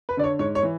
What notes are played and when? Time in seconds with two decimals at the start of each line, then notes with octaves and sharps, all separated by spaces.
0.09 B4
0.17 D3 D5
0.24 C#5
0.39 G#2 C#5
0.55 C#5
0.63 E3